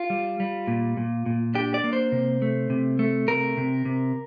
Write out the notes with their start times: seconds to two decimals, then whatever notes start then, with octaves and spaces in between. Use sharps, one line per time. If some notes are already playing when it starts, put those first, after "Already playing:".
Already playing: F4
0.10 G3
0.40 G3
0.68 A#2
0.97 A#2
1.26 A#2
1.54 D4 G4
1.74 D5
1.84 A#3
1.93 C5
2.12 C3
2.42 A3
2.70 C3
2.99 A3
3.28 C3 A#4
3.57 C3
3.85 C3